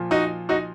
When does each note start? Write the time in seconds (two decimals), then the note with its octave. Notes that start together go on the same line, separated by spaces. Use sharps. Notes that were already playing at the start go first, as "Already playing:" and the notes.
Already playing: A#2 F3
0.11 D#4 F#4
0.49 D#4 F#4